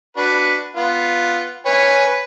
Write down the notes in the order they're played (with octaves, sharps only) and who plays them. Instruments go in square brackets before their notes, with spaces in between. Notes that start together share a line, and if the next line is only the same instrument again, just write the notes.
[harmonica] D4 F#4 B4
B3 F4
B4 C#5 G#5
B4